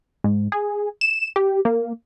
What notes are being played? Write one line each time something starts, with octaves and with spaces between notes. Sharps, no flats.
G#2
G#4
E7
G4
A#3